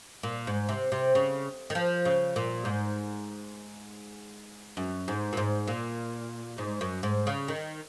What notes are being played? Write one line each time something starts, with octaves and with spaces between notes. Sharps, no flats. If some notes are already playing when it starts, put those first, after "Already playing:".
A#2
G#2
C3
C3
C#3
D#3
F3
C#3
A#2
G#2
F#2
G#2
A#2
G#2
A#2
G#2
F#2
G#2
C#3
D#3